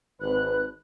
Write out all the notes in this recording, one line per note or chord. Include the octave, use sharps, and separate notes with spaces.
G#1 B4 F#6